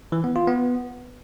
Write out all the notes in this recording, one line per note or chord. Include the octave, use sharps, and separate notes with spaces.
E3
B3
F4
B3